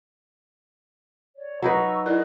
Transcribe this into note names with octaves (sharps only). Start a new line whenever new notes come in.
C#5 D5
F#3 D#4 B4 A#5 C#6 E6
E4 G#4 A#4 D5 D#5 F#6